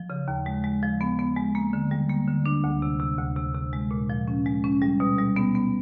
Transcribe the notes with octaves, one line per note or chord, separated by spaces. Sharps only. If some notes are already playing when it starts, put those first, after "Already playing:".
Already playing: F3
C#3
D#2
G#3
G#3
F3
B3
B3
G#3
A#3
D3
G3
A#3
D3
D4
D2
C3
C3
D2
C3
C3
G#3
A#2
F3
C#4
G#3
C#4
G3
B2
G3
B3
B3